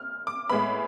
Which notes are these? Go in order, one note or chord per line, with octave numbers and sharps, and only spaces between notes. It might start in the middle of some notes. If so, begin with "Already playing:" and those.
Already playing: F6
D6
A2 G#3 B3 B5